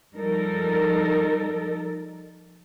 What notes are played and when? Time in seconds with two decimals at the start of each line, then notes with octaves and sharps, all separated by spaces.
0.17 F3 G3 D#4 A4 A#4